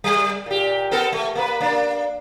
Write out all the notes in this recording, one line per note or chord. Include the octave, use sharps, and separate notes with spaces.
G3
A#2 G4
B3 A4 A#4
A3
A#3 B4
A#3 D4